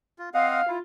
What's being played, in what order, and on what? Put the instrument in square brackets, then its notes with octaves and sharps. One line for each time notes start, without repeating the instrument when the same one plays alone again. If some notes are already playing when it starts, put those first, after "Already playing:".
[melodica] F4
[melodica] C4 D#5 F#5 [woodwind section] F5
[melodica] E4 [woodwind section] F4